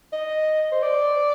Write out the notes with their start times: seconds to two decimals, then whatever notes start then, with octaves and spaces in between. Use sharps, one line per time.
0.12 D#5
0.71 C5
0.83 D5